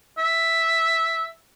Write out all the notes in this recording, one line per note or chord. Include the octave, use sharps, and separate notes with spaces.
E5